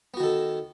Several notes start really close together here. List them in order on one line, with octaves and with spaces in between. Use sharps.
B3 F#4 D#3 A4